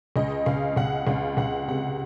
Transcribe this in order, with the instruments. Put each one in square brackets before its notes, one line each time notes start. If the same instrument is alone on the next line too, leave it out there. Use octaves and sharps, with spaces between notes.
[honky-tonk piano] C#2 D#5
C#2 F5
C#2 F#5
C#2 F5
C#2 F#5
C3 F#5